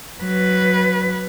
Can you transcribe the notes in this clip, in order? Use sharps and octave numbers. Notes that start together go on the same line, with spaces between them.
F#3 B4